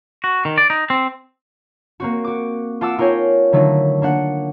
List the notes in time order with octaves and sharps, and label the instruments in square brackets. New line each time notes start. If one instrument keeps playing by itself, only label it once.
[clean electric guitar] F#4
D#3
D5
D#4
C4
[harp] A#3 C4 F#4
F#4 D6
F4 F#5 A5 D6 E6
D#4 F4 A#4 C#5 G5 G#5
D3 D#3 F#3 A3 D#4
A#3 D4 F#5